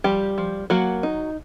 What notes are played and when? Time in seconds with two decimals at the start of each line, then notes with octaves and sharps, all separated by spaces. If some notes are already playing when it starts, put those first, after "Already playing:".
0.04 F3 G3 G4
0.38 F3
0.70 F#3 A#3 F#4
1.03 D#4